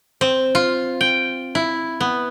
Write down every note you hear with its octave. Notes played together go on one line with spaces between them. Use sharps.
C4
F4
G5
E4
B3